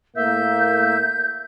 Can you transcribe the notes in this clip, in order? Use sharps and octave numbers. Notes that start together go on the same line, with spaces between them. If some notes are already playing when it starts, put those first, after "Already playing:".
A2 A#3 E5 G6